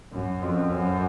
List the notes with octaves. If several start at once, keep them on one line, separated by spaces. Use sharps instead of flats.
F#2
F2
F#2